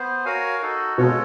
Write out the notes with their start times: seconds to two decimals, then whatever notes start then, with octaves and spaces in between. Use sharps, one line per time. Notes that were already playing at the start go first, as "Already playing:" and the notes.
Already playing: B3 C5
0.25 F#4 A#4 C#5 F5 G#5
0.62 D#4 F#4 A4
0.97 B2 G#3 C#4 F4 A4 C#5